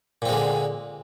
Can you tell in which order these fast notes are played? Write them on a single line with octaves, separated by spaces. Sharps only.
A#2 C4 G#3 D3